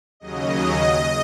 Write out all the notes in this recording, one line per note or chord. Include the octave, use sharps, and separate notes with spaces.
D#2 C#3 F#3 D#5